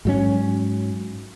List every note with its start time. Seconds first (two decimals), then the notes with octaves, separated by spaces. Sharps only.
0.05 G#2 F#3 C#4